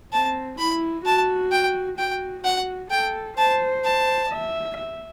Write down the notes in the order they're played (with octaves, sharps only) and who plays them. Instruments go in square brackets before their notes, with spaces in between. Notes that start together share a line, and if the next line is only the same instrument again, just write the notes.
[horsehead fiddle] C4 [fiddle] A5
[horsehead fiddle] E4 [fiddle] B5
[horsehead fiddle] F#4 [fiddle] A5
[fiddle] G5
[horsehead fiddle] F#4 [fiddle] G5
[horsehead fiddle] F#4 [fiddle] F#5
[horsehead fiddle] A4 [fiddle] G5
[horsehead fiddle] C5 [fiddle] A5
[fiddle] A5
[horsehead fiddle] E5
E5